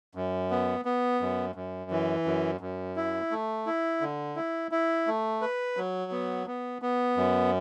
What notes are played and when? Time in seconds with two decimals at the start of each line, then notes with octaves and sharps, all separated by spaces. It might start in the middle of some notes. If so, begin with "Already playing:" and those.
0.15 F#2
0.51 B3
0.85 B3
1.21 F#2
1.55 F#2
1.91 E3
2.26 F#2
2.61 F#2
2.96 E4
3.31 A3
3.66 E4
4.01 D3
4.36 E4
4.71 E4
5.07 A3
5.41 B4
5.77 F#3
6.11 B3
6.47 B3
6.82 B3
7.17 F#2